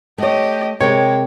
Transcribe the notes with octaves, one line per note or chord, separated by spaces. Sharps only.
A3 G4 C#5 D#5
C3 G#3 A#4 C#5 G5